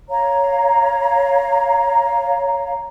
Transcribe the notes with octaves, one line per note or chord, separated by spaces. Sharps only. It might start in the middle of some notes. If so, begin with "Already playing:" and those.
C#5 F5 A#5